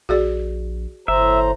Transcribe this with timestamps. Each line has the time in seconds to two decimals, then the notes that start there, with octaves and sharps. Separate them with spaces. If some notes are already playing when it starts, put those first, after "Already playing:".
0.09 A#1 F#4 G#4 D5
1.08 G1 A2 C5 E5 A#5